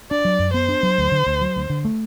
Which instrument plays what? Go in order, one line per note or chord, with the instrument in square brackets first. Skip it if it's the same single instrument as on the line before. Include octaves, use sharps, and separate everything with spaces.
[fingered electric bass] D4 [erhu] D5
[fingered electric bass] F#3
F#2
[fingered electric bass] B3 [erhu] C5
[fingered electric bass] D4
F#3
D2
D3
D2
F#3
D2
D3
A3